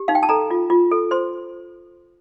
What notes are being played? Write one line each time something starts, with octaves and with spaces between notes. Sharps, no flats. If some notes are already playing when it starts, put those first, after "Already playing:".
Already playing: G4
D#4 F5
G5
A5
A4 A#5
F4
F4
A4
C5 C6